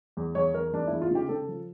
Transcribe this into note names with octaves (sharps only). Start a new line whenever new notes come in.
E2
E2 C#5
E2 A#4
E2 D4
E2 E4
F4
C#3 G4
C#3 A4
F3